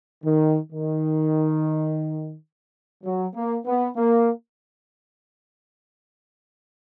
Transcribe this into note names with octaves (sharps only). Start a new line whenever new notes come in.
D#3
D#3
F#3
A#3
B3
A#3